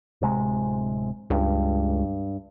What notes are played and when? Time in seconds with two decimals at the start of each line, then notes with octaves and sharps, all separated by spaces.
0.22 D1 C3 G#3
1.30 C#2 G2